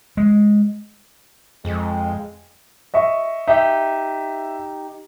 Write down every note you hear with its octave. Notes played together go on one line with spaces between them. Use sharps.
G#3
F2 G#3
D#5 E5 C#6
D#4 G4 E5